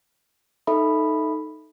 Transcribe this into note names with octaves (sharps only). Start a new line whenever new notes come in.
D#4 A4 E5 B5